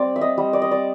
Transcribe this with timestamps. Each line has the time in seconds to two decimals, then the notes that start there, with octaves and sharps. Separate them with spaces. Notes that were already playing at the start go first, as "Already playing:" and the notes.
Already playing: G3 C4 D5
0.16 E5
0.21 D#5
0.37 G3
0.53 D5
0.62 D#5
0.71 D5